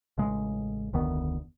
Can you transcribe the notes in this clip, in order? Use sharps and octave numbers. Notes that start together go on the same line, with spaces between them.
A1 C#3 G#3
F1 D2 D#3 B3